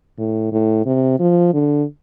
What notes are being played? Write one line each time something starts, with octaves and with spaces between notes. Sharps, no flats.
A2
A2
C3
F3
D3